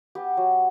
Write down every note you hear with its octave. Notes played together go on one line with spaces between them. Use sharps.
B3 G4
F#3